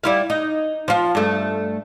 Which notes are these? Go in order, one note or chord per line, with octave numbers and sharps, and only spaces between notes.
G3 E4 F5
D#4
F3 F4
G2 A3